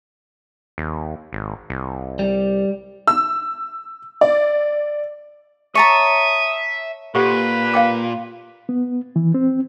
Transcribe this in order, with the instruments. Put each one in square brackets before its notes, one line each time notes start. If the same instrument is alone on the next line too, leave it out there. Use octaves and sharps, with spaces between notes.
[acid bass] D#2
G#1
C2
[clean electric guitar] G3
[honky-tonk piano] E6
D5
[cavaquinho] C#5 A5 A#5 [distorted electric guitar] E5 [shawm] D#6
[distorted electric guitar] A#2 [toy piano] G4 A4 F#5 [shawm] B4
[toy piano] F5 G5 D6
[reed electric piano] B3
E3
C4